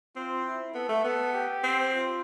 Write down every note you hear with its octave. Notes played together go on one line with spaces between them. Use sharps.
C4 F4
E4
B3 A4
A3
B3 A4
G4
C4
F4